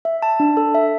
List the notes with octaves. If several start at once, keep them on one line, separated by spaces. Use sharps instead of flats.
E5
A5
D4
A4
E5